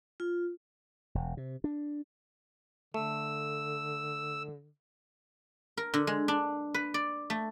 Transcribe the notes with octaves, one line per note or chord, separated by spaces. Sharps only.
F4
E1
C3
D4
D3 A3 E6
A#4
D3
G#3
D4
B4
D5
A3